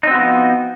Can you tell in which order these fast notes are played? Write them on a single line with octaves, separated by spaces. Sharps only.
D#4 C4 F#4 B3 F3